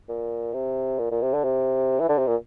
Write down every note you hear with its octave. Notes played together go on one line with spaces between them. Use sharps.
A#2
C3
A#2
A#2
C3
D3
C3
E3
D3
C3
A#2